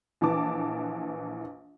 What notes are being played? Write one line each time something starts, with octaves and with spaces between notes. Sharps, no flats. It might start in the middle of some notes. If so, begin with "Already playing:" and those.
A#1 E3 A5 D6